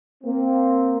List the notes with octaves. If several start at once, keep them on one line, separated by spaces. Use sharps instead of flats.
A#3 C4